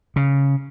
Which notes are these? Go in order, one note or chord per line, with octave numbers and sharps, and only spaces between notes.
C#3